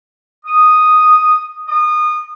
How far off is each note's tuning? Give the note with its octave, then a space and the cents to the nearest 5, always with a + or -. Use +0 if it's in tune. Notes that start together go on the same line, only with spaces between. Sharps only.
D#6 -5
D#6 -25